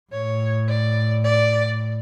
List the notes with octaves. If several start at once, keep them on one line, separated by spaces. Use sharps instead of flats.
A2 C#5
D5
D5